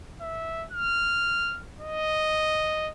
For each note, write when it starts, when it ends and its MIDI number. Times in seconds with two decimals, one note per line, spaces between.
0.21 0.65 76
0.72 1.61 89
1.81 2.90 75